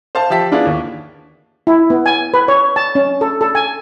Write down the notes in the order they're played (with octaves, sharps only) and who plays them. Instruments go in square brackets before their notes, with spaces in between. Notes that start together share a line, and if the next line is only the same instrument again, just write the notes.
[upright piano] C5 F5 A5
F3 G4 E5 A5 B6
B3 D4 E4 F4 G#4
D#2
[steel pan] E4
B3
G#5
B4
C#5
A5
C#4
A4
A4
G#5